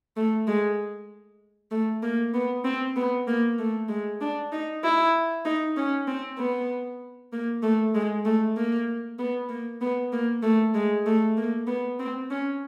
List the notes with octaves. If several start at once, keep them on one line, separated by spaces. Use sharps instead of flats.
A3
G#3
A3
A#3
B3
C4
B3
A#3
A3
G#3
D4
D#4
E4
D#4
C#4
C4
B3
A#3
A3
G#3
A3
A#3
B3
A#3
B3
A#3
A3
G#3
A3
A#3
B3
C4
C#4